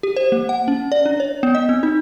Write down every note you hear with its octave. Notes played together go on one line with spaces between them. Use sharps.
G4
C5
A#3
F#5
C#4
D5
D4
C#5
B3
D#5
C4
D#4